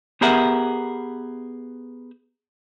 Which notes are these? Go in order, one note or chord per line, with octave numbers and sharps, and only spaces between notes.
B3 G4 G#4 A#4 E5 F#5